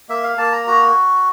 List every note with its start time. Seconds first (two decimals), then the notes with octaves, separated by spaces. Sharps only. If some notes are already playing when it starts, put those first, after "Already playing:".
0.09 A#3 E5
0.24 F5
0.38 A#3 A5
0.52 A#5
0.67 F#4 A#5